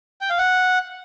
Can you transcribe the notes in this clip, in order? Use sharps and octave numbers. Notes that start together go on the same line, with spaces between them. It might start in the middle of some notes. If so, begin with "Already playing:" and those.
G5
F5
F#5